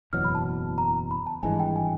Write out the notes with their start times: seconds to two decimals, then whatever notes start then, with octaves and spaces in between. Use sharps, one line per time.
0.13 F#1 E2 B2 F#3 F6
0.24 B5
0.35 A5
0.78 A#5
1.11 B5
1.27 A5
1.43 G#1 G2 E3 G#3 G#5
1.60 G5
1.76 G#5